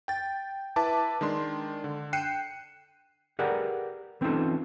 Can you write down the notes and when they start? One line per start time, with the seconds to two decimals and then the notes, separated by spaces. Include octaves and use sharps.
0.08 G5 A6
0.76 E4 B4 E5 A5 D6
1.21 D#3 G#3 D4 C6
1.84 D3
2.13 G5 F#6 C7 C#7 D#7 E7
3.39 G4 G#4 A#4 B4 D5 F#5
4.21 E3 C4 C#4 D#4 F4 A4